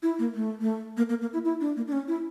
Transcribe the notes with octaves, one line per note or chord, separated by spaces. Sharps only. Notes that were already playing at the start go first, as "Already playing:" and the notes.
E4
A#3
A3
A3
A#3
A#3
A#3
E4
E4
D4
A#3
D4
C#4
E4